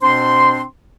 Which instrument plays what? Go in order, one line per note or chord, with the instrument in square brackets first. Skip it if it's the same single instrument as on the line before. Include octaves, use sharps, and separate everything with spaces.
[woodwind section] B2 C4 D4 C5 C6